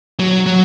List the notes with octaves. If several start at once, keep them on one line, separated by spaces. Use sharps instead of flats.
F#3
F#3